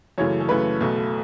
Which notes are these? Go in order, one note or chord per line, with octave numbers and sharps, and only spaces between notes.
F#2 C#3 E3 A3 C#5
A4
F#2 C#3 E3 A3 B4
B1 B2 A3